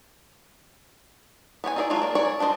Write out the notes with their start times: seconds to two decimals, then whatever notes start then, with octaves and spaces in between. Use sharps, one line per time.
1.64 B3 C#5 G5 G#5
1.76 D#4 E4 G#4 C#5 D5
1.90 F#3 G#3 A3 F4
2.02 A#3 D5
2.15 G#4 C#5 D5
2.39 F3 D4 E4 C5 D#5